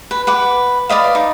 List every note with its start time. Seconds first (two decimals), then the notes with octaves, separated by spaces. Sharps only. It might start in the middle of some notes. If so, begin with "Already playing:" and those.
0.11 B4
0.27 B4 F#5 D6
0.89 B4 D5 D#5 F5
1.15 D#4